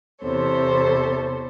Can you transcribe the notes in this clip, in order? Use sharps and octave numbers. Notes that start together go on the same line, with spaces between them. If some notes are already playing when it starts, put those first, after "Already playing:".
E2 C3 A4 C5 C#5